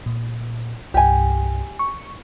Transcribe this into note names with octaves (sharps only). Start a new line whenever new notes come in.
A#2
C2 G2 G4 G#5
C#6